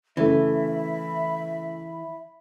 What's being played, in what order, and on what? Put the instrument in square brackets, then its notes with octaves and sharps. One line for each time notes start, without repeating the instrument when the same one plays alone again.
[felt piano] C#3 A3 [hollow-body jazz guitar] E3 [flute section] E5 B5